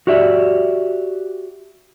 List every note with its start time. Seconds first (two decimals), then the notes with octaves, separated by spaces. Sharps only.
0.07 F#4 G4 D5 E5